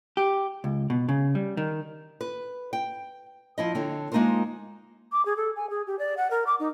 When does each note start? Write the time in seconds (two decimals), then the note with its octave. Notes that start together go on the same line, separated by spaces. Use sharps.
0.17 G4
0.64 C#2
0.90 B2
1.09 C#3
1.35 G3
1.57 D#3
2.21 B4
2.73 G5
3.58 F3 E4 D#5
3.75 D3 C4 C#5
4.12 G#3 A#3 D#4 F4 A#4 C5
5.12 D6
5.26 G#4
5.37 A4
5.56 G#5
5.70 G#4
5.87 G4
5.99 D5
6.17 F#5
6.31 A#4
6.47 D6
6.60 D#4